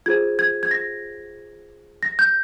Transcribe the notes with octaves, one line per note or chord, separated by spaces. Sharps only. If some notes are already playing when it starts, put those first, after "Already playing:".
F4 G#4 C5 G#6
G#6
G#6
A#6
A#6
G6